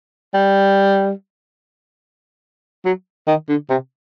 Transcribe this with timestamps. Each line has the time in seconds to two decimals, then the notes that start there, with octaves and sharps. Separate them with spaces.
0.34 G3
2.85 F#3
3.27 D#3
3.49 D3
3.70 C3